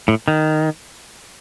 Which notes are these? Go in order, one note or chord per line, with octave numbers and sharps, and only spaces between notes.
A2
D#3